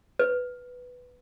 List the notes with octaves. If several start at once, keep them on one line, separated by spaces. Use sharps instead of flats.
B4